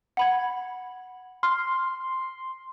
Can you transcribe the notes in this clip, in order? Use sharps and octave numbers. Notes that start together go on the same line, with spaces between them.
F#5 B5 G#6
C6 F6